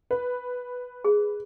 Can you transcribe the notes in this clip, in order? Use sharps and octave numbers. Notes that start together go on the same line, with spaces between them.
B4
G#4